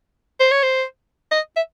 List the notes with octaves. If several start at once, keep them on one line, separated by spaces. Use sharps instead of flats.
C5
C#5
C5
D#5
E5